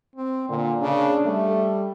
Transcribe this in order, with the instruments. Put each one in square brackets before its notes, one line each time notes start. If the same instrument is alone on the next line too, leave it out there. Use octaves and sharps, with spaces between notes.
[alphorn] C4
[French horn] A#2 [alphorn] D3
[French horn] C#3 [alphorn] D4
[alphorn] G3 [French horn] A3